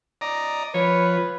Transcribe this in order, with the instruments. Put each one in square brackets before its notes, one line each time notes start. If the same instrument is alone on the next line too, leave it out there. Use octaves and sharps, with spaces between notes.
[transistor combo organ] D5 D#5 A#5
[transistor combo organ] F3 [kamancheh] B4 [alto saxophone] C#5